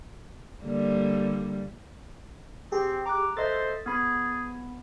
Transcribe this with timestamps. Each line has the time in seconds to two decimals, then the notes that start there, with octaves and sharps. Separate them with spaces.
0.64 D3 G3 A#3
2.72 C4 G4 G#4
3.06 A#5 D6 F#6
3.37 A4 C5 D#5 E5 A6
3.86 B3 G#4 B5